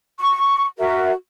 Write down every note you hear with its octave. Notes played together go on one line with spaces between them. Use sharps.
C#6
F#4 A#4 E5